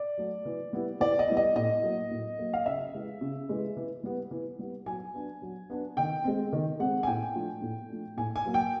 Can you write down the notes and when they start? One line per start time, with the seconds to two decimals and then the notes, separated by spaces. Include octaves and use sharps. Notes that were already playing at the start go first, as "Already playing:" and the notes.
Already playing: D5
0.18 F#3 A3
0.45 E3
0.73 G3 B3 E4
1.00 E3 D5
1.19 D#5
1.27 G3 B3 E4
1.37 D#5
1.56 A2 D#5
1.83 F#3 A#3
2.11 A2
2.39 F#3 A#3
2.53 F5
2.66 C#3 E5
2.94 E3 G#3
3.21 C#3
3.49 E3 G#3
3.77 E3
4.03 G3 B3
4.31 E3
4.59 G3 B3
4.86 F#3 G#5
5.14 B3 D4
5.42 F#3
5.70 B3 D4
5.97 D#3 G5
6.24 G#3 C4
6.53 D#3
6.79 G#3 C4 F#5
7.03 G#5
7.07 A2 G5
7.35 F3 A3 D4
7.62 A2
7.90 F3 A3 D4
8.17 A2 G#5
8.36 G#5
8.45 F#3 A#3
8.54 G5